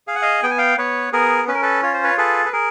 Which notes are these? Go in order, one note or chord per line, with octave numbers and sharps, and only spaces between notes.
G#4 F5
F#5
D#5 F5
B3 G5
G#5
F5 G5
B3 B4 C#5
B3 G#4 A#4
C#4 B4
A#4
A4 B4
F4 C#5
C5
B4 C#5
G#4 A4 B4
B4
G#4 A#4